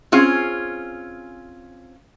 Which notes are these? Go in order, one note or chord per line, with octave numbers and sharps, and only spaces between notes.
C4 C#4 F4 G#4